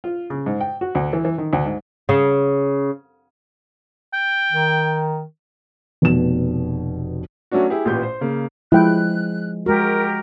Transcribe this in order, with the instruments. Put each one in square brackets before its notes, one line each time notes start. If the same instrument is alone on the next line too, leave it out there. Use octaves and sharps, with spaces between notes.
[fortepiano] F4
C#3
G#2
G5
F#4
D2
E3
E3
D#3
D2
G#2
[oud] C#3
[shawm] G5
[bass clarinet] D#3
[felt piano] F1 B2 E7
[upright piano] F#3 A3 C#4 D4 F#4
E4 G4 G#4
A1 A#2 G4 B4 G6
C5
C#3 A#3
[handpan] F3 G#3 [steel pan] E4 G5 [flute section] F#6
[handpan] G#3 F#4 [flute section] G4 A#4